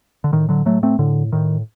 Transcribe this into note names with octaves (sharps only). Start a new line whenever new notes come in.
D3
A2 D#3
D3 F#3
A2 F#3 A3
A3 C4
A2 D3
A2 D#3